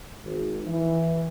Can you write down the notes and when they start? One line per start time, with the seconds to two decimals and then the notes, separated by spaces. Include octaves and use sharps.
0.24 G#1
0.67 E3